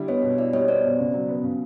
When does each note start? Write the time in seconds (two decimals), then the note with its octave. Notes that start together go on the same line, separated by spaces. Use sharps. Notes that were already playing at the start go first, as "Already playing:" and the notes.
Already playing: D3 G3 E4
0.08 B3 C#5 D#5
0.23 B2
0.38 E4 D5 E5
0.53 G3 C#5 D#5
0.68 B3 C5 D5
0.84 B2
0.99 C#3
1.14 F#3
1.29 B3
1.44 C#3